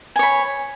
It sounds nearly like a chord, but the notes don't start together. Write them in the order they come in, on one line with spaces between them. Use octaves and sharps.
G#5 C#5 B5